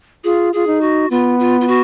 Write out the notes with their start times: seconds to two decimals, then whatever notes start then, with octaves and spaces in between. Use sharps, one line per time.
0.24 F4 G#4
0.53 F4 G#4
0.67 D#4
0.81 F#4
1.10 B3 F4
1.39 F4
1.61 F4
1.68 F#4